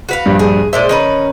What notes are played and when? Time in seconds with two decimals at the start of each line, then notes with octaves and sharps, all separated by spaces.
0.09 F#4 B4 F5
0.26 A#1 G2 G3
0.39 G#4
0.73 A#2 G#3 C5 D5 E5
0.89 D#3 C#4 B4 D#5